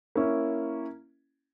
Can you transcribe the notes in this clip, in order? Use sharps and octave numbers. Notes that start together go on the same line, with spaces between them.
A#3 C#4 E4